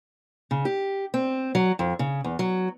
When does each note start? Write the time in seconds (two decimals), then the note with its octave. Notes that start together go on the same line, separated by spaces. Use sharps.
0.51 C#3
0.65 G4
1.14 C4
1.55 F#3
1.79 F2
1.99 C#3
2.24 E2
2.39 F#3